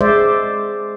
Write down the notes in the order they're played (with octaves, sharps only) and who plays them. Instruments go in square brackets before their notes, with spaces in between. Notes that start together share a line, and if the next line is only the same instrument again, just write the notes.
[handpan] G#3 C5 D5 E5